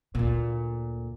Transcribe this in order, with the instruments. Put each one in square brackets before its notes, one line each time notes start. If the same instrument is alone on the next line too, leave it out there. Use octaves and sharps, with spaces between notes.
[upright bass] D2 A#2